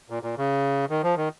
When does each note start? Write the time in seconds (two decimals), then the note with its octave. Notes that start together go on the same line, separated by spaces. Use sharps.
0.10 A#2
0.23 A#2
0.37 C#3
0.90 D#3
1.03 F3
1.17 D#3